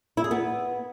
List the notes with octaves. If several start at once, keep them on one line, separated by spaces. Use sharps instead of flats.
E4
G#4
B3